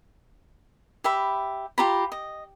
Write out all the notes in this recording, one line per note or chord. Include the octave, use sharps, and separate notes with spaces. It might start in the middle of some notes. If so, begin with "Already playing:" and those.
G4 E5 B5
F4 G4 A#5 B5
D#5